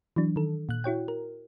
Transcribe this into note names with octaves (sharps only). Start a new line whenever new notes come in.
E3 F#3 D4
D#3 A4
A#2 F#6
E4 F#4 C#5 G5
A#4